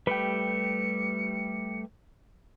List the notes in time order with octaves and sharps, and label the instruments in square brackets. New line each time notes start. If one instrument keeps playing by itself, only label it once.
[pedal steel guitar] G3 A3 G4 [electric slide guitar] B4 G5 [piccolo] C#7